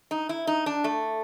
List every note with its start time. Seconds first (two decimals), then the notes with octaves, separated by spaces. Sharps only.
0.11 D#4
0.29 E4
0.47 D#4
0.66 D4
0.84 A3